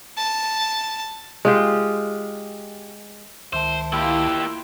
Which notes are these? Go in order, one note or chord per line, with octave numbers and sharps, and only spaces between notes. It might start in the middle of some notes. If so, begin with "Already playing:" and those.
A5
G#3 F4 G4
C#2 D#3 C5 E5 A5
A#3 E4 F4 G4 G5 E6